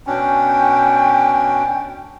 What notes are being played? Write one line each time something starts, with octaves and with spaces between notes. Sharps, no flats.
B2 C#4 D4 G5